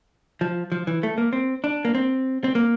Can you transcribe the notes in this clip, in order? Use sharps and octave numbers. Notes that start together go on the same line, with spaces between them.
F3
F3
E3
A3
A#3
C4
D4
A#3
C4
C4
A#3